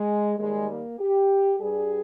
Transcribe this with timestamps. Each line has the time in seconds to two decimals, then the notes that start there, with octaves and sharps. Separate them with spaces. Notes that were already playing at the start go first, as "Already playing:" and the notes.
Already playing: G#3
0.38 D#2 D#3 G3 G#3
0.68 A#3
1.00 G4
1.60 G2 G3 G#4